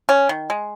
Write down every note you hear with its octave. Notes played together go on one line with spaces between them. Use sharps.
C#4
D#3
G#3